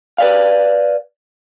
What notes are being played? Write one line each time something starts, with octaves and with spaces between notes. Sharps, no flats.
B4 D5 F5